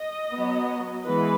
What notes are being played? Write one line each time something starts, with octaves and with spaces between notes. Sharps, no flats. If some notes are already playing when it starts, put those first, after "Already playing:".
Already playing: D#5
F#3 B3
E3 G#3 B3 B4